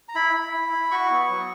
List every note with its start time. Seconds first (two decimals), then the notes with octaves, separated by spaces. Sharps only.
0.08 A#5
0.15 E4 B5
0.34 E4
0.54 E4
0.72 E4
0.91 F#4 C#6
1.10 B3
1.29 F#3